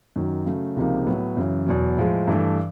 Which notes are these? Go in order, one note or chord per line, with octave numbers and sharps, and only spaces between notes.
F#2 D#3 F#3
C#3 F#3 A3
C#2 C3 F3 A#3 D#4
A2 F#3 B3
F#2 C#3 E3
E2 B2 F#3
A2 F3 G#3
G2 E3 A3